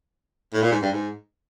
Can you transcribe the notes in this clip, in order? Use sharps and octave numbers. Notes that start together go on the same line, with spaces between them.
A2
A#2
G#2
G2
G#2